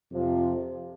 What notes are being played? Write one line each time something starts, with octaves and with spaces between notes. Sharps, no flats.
F2 C3 F3